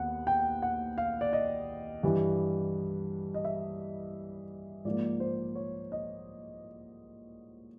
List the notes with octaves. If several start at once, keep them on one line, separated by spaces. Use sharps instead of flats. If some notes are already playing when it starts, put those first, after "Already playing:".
Already playing: D#2 B3 F#5
G5
F#5
F5
D5
D#5
G2 E3 G3
D#5
E5
G#2 F3 A#3 D5
C5
C#5
D#5